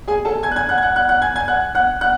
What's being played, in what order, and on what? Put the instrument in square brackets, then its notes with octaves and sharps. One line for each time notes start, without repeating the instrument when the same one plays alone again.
[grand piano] G#4 G#5
A4 A5
G#5 G#6
F#6
G#5 G#6
F#5 F#6
G#6
F#5 F#6
F#5 F#6
F#5 F#6
G#5 G#6
G#5 G#6
F#5 F#6
F#5 F#6
F#5 F#6